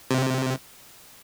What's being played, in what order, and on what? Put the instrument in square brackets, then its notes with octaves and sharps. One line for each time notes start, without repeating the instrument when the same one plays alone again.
[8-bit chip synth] C3